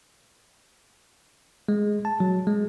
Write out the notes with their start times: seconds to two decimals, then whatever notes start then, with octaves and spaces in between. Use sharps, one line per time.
1.68 G#3
2.05 A5
2.20 F#3
2.47 G#3